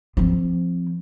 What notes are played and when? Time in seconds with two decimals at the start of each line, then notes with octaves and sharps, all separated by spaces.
0.17 F3 C4